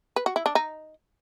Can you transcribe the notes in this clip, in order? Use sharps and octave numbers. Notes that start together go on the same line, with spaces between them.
B4
F#4
E4
D4
D#4